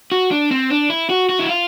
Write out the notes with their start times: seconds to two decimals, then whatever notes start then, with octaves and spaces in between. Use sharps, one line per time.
0.12 F#4
0.31 D4
0.51 C4
0.70 D4
0.90 E4
1.10 F#4
1.29 F#4
1.39 E4
1.49 F4